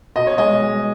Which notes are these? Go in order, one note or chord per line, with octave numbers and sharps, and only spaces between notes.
B2 D#5
C#5
G#3 D#5
G#3